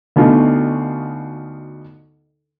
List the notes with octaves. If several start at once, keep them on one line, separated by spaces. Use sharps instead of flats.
D2 B2 D#4 F4